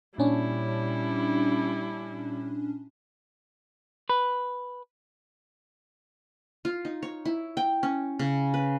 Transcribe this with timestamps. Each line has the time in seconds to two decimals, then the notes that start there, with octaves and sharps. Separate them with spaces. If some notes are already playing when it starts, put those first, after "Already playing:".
0.18 A#2 G3 C#4 D4 E4
4.09 B4
6.65 F4
6.85 D#4
7.03 C#5
7.25 E4
7.57 G5
7.83 C#4
8.19 C#3
8.54 B4